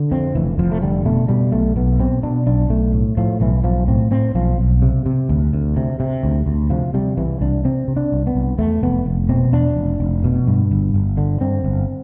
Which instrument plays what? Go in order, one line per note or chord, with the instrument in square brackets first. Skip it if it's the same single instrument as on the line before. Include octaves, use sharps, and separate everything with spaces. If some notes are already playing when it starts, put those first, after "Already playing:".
Already playing: [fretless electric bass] D3
F2 C4
F1 E3
F1 F3
A3
D3 G3
B2 A3
B2 G3
B1 A3
B1 B3
B2 C4
B2 D4
B1 D4
B1 A3
A2
A2 F3
B1 E3
B1 F3
A2 C4
A2 C4
B1 F3
B1
C3
C3
D2
D2
C3
C3
D2
D2
C3 F3
C3 G3
C2 E3
C2 D4
C3 C4
C3
D4
C2
B3
C2
E2 A3
F1 B3
F1
B2 C4
E2 D4
F1
F1
B2
G2
G1
G1
D3
G2 C4
G1